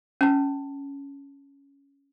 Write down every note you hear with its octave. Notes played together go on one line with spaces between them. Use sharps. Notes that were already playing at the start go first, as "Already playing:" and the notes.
C#4 A5